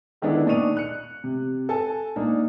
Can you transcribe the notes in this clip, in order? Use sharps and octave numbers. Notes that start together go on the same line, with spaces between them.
D3 D#3 G#3 B3 D4 E4
A#2 D4 D#4 C#6 D#7 F7
F#6 C#7
C3
A4 G#5 A5
A#2 A#3 D4 D#4